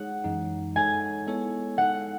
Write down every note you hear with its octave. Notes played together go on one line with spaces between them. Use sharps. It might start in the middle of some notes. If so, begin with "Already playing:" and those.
Already playing: G#3 D#4 G#4 C#5 F#5
F#2 E3 G#3 D#4
G#3 D#4 A4 C#5 G#5
G#3 B3 E4 A4 C#5
G#3 D#4 A4 F#5